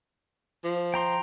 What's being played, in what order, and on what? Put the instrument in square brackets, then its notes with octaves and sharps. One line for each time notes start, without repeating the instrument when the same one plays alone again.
[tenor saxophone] F3
[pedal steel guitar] G5 A#5 C6